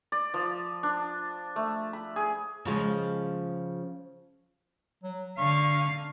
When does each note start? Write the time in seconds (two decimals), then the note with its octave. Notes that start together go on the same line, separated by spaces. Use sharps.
0.12 D5
0.34 F3
0.83 D4
1.56 A3
1.93 B5
2.16 G#4
2.65 C#3 F3 G#3
5.04 F#3
5.38 D3 F5 C#6